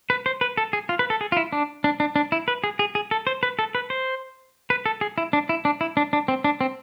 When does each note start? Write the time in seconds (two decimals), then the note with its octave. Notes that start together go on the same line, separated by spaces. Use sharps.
0.10 B4
0.26 C5
0.41 B4
0.57 A4
0.73 G#4
0.89 F4
0.99 B4
1.10 A4
1.21 G#4
1.32 F4
1.37 E4
1.53 D4
1.84 D4
2.00 D4
2.16 D4
2.32 E4
2.48 B4
2.64 G#4
2.79 G#4
2.95 G#4
3.11 A4
3.27 C5
3.43 B4
3.59 A4
3.75 B4
3.90 C5
4.70 B4
4.86 A4
5.01 G#4
5.18 E4
5.33 D4
5.49 E4
5.65 D4
5.81 E4
5.97 D4
6.13 D4
6.28 C4
6.44 D4
6.61 C4